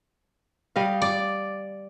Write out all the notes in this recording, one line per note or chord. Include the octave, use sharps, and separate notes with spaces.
G3 D#5 F5
D5